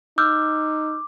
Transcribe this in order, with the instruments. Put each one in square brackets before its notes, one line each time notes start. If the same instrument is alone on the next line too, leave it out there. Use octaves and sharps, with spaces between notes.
[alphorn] D#4 [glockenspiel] D6 [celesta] E6 F6 G6